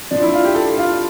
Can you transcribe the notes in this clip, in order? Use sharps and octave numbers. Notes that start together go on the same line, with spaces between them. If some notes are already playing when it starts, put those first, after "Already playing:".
A#2 F3 D4
E4
F4
G4
A4
F4